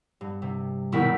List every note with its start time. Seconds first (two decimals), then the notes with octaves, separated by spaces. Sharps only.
0.21 G2
0.42 C3
0.92 D#1 B1 B2 D#3 E4 B6